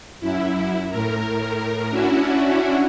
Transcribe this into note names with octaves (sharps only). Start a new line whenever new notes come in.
F#2 E4
A2 A#4
C#4 D4 E4 F#4